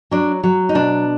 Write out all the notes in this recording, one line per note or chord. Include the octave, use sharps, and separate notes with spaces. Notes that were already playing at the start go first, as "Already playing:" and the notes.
F#3 D4
F#3
D#4
B2 D4